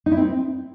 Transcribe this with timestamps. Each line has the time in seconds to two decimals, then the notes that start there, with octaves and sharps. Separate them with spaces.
0.06 D#4
0.12 E4
0.17 C4